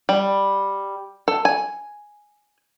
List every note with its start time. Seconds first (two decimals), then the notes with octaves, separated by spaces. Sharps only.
0.09 G3
1.28 A4
1.45 G#5